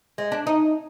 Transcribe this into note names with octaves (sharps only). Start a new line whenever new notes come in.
G#3
D4
D#4